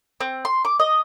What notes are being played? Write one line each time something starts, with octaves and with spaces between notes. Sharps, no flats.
C4
C6
D6
D#5